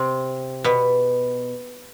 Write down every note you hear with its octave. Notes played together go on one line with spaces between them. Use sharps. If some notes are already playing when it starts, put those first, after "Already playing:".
Already playing: C3 C4
B2 B3